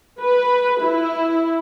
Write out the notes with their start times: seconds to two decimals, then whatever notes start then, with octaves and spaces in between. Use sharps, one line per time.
0.21 B4
0.82 E4